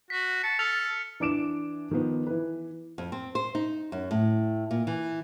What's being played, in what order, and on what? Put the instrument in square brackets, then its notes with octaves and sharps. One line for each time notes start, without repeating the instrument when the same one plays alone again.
[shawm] F#4 [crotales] B6
[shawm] A5 [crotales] C#7
[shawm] A4 [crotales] F6 A6 F7
[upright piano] E3 D4 D6 D7 E7
D#3 F3 B3
E3 B4
[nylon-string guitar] F2
C4
C5
D#4
F#2
A2
A#2
E3